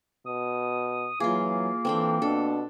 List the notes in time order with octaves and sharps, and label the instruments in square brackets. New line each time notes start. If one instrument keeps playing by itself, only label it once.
[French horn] B2 [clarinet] D#6
[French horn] E3 [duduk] F#3 [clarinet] A#3 [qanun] F4 G#4
[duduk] E3 [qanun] C4 D4 G5 [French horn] A4
[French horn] B2 [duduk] D4 [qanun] A4